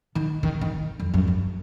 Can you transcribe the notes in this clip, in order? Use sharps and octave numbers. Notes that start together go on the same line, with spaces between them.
D#3
D#3
D#3
F2
F#2
F#2